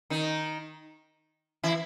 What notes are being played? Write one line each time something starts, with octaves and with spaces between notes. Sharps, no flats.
D#3 D#4
E3 E4